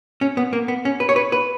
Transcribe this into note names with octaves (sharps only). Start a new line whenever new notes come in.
C#4
B3
A#3
B3
C#4
B4
C#5
B4
B4